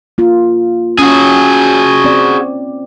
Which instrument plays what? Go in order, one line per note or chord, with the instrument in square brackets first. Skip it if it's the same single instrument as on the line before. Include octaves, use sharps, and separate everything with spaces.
[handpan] A#3 F4
[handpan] C#4 [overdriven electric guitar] F#4 G#4
[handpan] C4 D5